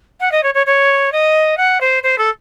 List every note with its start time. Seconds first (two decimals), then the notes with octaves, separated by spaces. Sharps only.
0.20 F#5
0.32 D#5
0.43 C#5
0.54 C#5
0.66 C#5
1.12 D#5
1.57 F#5
1.81 C5
2.03 C5
2.18 A4